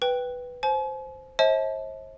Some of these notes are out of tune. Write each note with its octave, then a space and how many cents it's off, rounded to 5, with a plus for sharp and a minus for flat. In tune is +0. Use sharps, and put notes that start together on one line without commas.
B4 +0 G5 +0
C5 +0 G#5 +45
C5 +45 E5 -45 A5 -25